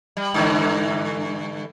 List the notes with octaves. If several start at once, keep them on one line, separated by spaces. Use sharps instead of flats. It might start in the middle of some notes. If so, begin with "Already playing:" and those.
G3
G2 D3 E3